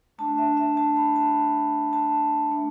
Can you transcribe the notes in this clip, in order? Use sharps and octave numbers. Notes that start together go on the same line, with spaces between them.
A3 D4 A5
E5
E5
A5
B5
A5
A5
A3 D4